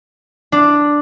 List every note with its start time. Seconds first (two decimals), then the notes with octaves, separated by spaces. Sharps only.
0.52 D4